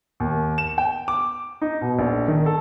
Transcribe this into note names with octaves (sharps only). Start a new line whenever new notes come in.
D#2
E7
G5
D6
D#4
B2
A#1
D#3
A4